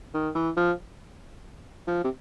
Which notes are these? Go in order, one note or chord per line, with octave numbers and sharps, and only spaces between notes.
D#3
E3
F3
F3
C3